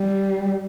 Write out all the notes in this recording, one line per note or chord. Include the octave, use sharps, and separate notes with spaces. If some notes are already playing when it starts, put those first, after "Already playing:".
Already playing: G3